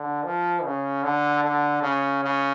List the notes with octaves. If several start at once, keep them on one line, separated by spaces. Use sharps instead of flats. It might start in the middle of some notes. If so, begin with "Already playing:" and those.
Already playing: D3
F3
C#3
D3
D3
C#3
C#3